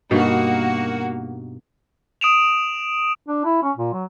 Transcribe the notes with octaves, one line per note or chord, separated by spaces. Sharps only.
G2 B2 A#3 D#4 F#4
D#6 D7 E7 F7
D4
E4
C#4
A#2
F#3